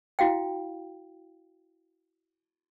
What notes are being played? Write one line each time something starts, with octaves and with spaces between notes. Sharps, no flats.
E4 F#4 F5 G5